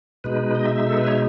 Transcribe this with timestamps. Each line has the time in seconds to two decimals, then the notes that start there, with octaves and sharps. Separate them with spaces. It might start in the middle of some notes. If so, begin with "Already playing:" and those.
0.24 B2 G#3 D#4 B4
0.55 D#5
0.66 E5
0.76 E5
0.87 A4
0.97 B4
1.07 C#5